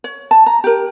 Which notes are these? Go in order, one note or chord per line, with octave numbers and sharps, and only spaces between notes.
C#5
A5
A#5
G4 A#4